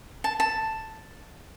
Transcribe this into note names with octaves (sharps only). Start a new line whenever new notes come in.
A5
A5